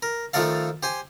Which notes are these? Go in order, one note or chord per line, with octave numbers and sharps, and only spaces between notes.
A#4
D#3 F3 A3 A4 D5 F5
G4 C5 G#5